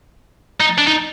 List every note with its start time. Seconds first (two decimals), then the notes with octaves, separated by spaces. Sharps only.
0.61 D#4
0.78 D4
0.87 D#4